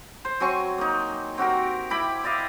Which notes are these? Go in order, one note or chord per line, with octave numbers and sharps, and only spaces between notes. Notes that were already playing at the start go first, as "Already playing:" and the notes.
C5
F#3 C4 G#5 C#6
A#3 D#4
C4 F#4 G4 A#4
E4 G4 B5 D6
E4 D5 D#5 F5